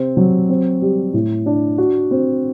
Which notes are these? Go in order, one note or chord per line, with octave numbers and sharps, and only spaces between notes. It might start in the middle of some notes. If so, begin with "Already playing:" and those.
Already playing: C3 C4
F#3
C4
G3
A2
D4
F#4
C4